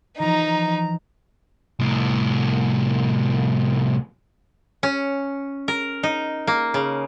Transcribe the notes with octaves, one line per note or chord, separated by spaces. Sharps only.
E3 F3 D#4 A#5
C2 A2
C#4
A#4
D#4
A#3
C#3